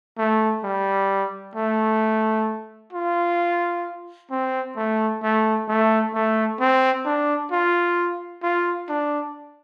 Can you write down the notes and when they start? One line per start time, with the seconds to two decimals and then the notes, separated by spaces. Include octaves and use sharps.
0.18 A3
0.64 G3
1.56 A3
2.93 F4
4.31 C4
4.77 A3
5.23 A3
5.68 A3
6.14 A3
6.60 C4
7.05 D4
7.52 F4
8.43 F4
8.89 D4